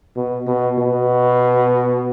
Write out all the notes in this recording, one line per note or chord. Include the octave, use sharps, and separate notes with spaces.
B2
B2
B2